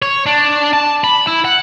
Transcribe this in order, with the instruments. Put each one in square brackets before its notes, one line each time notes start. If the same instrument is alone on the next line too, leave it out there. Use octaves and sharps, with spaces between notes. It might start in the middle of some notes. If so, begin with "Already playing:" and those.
[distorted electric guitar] C#5
D4
A5
B5
E4
F#5